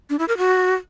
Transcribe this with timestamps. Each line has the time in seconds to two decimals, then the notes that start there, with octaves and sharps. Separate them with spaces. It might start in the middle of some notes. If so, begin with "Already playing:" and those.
0.10 D4
0.19 E4
0.28 A#4
0.38 F#4